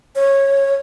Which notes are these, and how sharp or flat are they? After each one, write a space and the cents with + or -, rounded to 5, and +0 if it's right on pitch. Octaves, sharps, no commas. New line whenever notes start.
C#5 -15